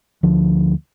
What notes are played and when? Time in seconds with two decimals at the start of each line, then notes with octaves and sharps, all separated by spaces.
0.23 D2 F3